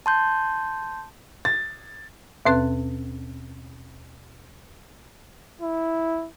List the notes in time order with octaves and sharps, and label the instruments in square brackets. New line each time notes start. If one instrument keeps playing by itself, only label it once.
[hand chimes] A5 C6 G6
[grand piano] A6
[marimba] D#2 B2 C4 B4 F#6
[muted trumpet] E4